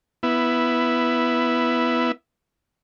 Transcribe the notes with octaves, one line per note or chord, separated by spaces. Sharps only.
B3 E4